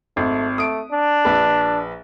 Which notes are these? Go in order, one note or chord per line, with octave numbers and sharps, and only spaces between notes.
G#1 A3
A3 D#6 D7
D4
A#1 B4